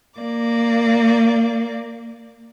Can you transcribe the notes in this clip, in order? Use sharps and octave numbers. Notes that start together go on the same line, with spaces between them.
A#3 D5